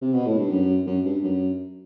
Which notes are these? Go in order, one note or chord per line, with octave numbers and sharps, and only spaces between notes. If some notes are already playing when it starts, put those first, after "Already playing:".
C3
B2
A2
G2
F#2
F#2
G2
F#2